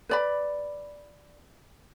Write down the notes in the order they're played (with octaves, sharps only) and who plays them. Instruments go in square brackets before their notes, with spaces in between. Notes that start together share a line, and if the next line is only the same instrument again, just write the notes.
[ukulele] B4 D5 B5